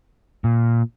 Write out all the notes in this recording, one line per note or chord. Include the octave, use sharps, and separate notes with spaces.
A#2